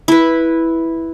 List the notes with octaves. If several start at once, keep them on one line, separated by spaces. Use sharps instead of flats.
E4 B4